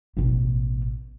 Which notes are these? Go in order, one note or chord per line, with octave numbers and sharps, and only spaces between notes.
A1 B2